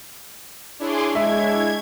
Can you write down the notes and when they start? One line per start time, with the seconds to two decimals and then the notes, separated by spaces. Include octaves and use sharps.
0.80 D4 E4 G#4 C#5 C6 D6
1.15 G#3 E5 G#6